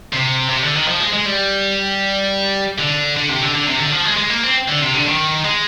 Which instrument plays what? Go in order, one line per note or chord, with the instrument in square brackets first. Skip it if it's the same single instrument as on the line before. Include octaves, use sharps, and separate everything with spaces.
[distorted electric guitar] C3
C3
D3
D#3
F3
G#3
G#3
G3
D3
D3
C3
D3
D3
C3
D3
F3
G#3
G#3
A#3
C4
D3
C3
D3
D#3
G#3